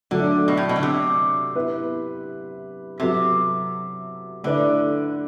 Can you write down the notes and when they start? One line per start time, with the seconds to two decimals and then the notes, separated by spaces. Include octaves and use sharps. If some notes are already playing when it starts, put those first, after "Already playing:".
0.11 D3 F#3 A3 D4
0.48 B2
0.57 A2
0.69 B2
0.76 D3
0.83 C3
1.55 B3 E4 B4
3.00 C3 F#3 B3 F#4 A4 E5
4.44 D3 A3 E4 B4 D5